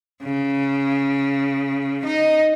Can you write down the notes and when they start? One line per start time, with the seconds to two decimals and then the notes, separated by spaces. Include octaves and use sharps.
0.23 C#3
2.05 D#4 D#5